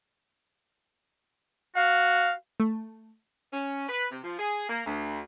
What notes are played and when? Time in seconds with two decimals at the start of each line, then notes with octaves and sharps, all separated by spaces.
1.76 F#4 F5
2.60 A3
3.53 C#4
3.89 B4
4.12 C3
4.24 F3
4.39 G#4
4.69 A#3
4.86 D2